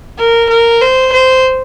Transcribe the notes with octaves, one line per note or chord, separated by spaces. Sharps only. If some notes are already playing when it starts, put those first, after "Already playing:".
A#4
A#4
C5
C5